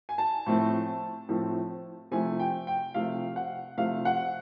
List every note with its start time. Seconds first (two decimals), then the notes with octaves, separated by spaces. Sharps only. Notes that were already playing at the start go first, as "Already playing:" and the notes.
0.09 G#5
0.18 A5
0.46 A2 F3 A3 C4
1.29 A2 F3 A3 C4
2.11 C3 F3 A3 G#5
2.39 G5
2.67 G5
2.94 C3 F3 A3 F5
3.36 F#5
3.77 C3 F3 A3 F5
4.05 F#5